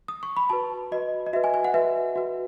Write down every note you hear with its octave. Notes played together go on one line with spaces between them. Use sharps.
D#6
C#6
B5
F#4 B4 A5
F#4 B4 D#5
D#5
F#4 B4 E5
G#5
G#5
F#5
F#4 B4 E5
F#4 B4